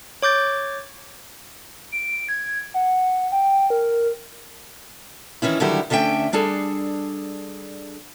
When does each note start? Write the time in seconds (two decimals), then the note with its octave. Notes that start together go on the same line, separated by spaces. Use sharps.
0.22 C#5 D6 G6 A6
1.92 D7
2.29 G#6
2.74 F#5
3.32 G5
3.70 A#4
5.42 D#3 E3 C#4 E4
5.60 D3 D#3 F#3 G3 E4 G4
5.90 D2 D3 C#4 E5 G5
6.33 G3 D4 G#4 A4